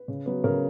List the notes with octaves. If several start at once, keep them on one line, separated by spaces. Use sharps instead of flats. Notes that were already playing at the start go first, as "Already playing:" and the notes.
Already playing: B4
C#3
F#3 B3
C#3 A#4